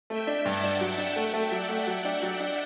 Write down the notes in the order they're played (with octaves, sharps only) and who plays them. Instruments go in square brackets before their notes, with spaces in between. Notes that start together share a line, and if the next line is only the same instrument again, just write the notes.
[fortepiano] A3 [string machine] E5 G5
[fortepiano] D4
[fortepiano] G2 [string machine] F#5 A5
[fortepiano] D4
F#3
D4
[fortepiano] A3 [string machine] E5 G5
[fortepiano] A3
[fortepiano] F#3 [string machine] D5 F#5
[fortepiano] A3
[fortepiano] F#3 [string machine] D5 F#5
[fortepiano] D4
F#3
D4